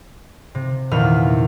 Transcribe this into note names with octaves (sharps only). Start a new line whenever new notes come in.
C3
E2 A#2 D#3 B5 F6